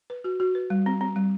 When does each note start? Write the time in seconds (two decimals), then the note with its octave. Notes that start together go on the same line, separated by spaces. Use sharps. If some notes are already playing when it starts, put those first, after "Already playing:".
0.10 B4
0.24 F#4
0.40 F#4
0.55 B4
0.70 G3
0.86 C4
1.01 C4
1.16 G3